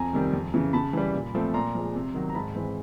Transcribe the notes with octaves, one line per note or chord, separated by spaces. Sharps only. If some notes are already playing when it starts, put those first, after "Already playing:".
Already playing: F2 G#5 A#5
C3 D#3 G3
F2
C#3 E3
C#3 A5 B5
E3 G3
A#2
F3 A3 C4
A#2 A#5 C6
F3 G#3
C3
D#3 F#3
A#5
G#2 A5 B5
E3 G#3 C4